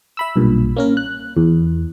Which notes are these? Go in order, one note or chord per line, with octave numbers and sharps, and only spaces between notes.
E5 B5 E6
B1 G2 A#2
A#3 C#4 A#4
F#6
E2